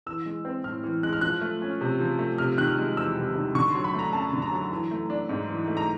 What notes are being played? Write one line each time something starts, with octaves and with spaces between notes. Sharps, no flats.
E3 E6
G#3
C4
A2 F6
E3
G#3 F#6
F6
F3 F#6
A3
C#4
C3
F3
A3
C3 F6
D#3 F#6
F6
G#3
E2 E6
C3
D#3
D3 C#6
C6
F#3
B5
A3
A#5
F#2 A5
D3
A#5
F#3
E3
A3
D4
G#2
E3
A3
A#5